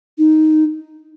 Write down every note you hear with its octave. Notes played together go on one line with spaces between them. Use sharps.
D#4